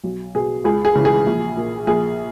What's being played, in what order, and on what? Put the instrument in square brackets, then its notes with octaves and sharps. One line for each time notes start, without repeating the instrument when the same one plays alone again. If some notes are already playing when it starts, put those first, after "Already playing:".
[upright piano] B1
B2 G#4
C#2 G#4
G#4
C#3 E3
G#4
A#1
A#2
A#1 G#4